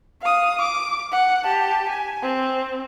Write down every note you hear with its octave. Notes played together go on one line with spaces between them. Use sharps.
F5 D#6
D6
F#5
G4 A5
G#5
C4